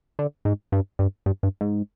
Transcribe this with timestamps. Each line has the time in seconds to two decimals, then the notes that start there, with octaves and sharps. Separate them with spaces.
0.19 D3
0.45 G#2
0.72 G2
0.99 G2
1.26 G2
1.43 G2
1.61 G#2